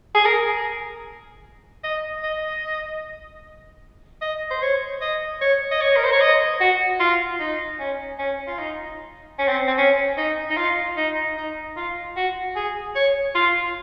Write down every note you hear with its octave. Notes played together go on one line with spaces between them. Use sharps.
G#4
A#4
D#5
D#5
D#5
C5
C#5
D#5
C#5
D#5
C#5
A#4
C5
C#5
D#5
F#4
F4
D#4
C#4
C#4
F4
D#4
C#4
C4
C4
C#4
D#4
D#4
F4
D#4
D#4
F4
F#4
G#4
C#5
F4